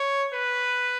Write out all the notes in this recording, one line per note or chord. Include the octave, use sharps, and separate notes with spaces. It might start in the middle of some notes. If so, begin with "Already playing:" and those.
Already playing: C#5
B4